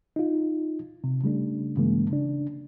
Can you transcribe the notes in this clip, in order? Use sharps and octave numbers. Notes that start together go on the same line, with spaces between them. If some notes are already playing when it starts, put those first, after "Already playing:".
D#4 F4
C3
C#3 G3 A3 D4
G2 C#3 E3 G#3 A#3
C#3 D4